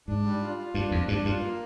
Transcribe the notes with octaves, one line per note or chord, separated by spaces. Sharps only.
G#2 D4
G3
F4
F4
G2 D4
F2 D4
G2 D4
G2 F4
A#3